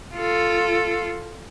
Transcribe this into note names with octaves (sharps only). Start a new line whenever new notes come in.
F4 A4